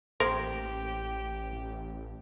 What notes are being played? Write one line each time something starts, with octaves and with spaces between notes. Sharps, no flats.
A1 A#3 G4 A#4 C5